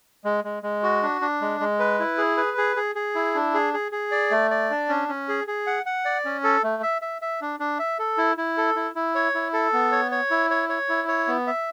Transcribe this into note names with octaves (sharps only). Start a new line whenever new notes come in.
G#3
G#3
G#3
F#4
D4
D4
G#3
G#3
B4
E4
G#4
B4
G#4
G#4
G#4
E4
D4
G#4
G#4
G#4
D5
A3
D5
D4
C#4
C#4
G#4
G#4
F#5
F#5
D5
C#4
A4
A3
E5
E5
E5
D4
D4
E5
A4
E4
E4
A4
E4
E4
C#5
E4
A4
B3
C#5
C#5
E4
C#5
C#5
E4
C#5
B3
E5